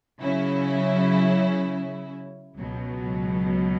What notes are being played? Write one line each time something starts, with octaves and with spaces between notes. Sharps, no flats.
C#3 F#3 C#4 E4
C#2 B2 F#3